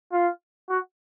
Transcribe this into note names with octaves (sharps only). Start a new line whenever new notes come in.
F4
F#4